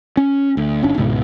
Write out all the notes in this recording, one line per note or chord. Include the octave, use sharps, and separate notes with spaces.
C#4
D2
G1 C#4 D4
C#2 G#2 B2 B3